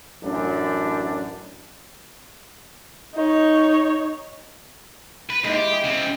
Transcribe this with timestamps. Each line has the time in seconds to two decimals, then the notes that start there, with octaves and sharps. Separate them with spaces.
0.23 A1 F#2 D4
3.14 D#4 C#5
5.30 B4
5.44 D#2 G#3 E4
5.56 G4
5.71 G#4
5.84 C#3 C4